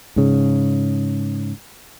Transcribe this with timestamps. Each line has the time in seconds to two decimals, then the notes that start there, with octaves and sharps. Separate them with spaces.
0.16 G#2 C#3